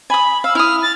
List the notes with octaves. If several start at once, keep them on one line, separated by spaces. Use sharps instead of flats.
G#5 B5 D#6
F5 E6
E4 D#6 F6
A6